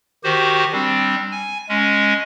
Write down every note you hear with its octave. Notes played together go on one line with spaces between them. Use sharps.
D#3 F#4 G4 C5
G3 C4 D4
G#5
G#3 C#4